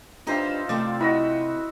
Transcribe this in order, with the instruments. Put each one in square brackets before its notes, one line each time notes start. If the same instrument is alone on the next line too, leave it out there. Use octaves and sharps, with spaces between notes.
[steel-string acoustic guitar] D4 G4 B4 [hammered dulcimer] D#4 C5 E5 [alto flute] F4
[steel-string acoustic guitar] C3 A3 C4 [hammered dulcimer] D5
[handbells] E4 [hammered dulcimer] F#4 D#5 E5